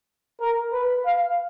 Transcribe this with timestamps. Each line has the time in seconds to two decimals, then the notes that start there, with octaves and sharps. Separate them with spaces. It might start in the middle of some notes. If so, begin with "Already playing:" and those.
0.41 A#4
0.73 B4
1.06 F5